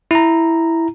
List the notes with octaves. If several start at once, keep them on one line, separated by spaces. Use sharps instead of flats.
E4 A#5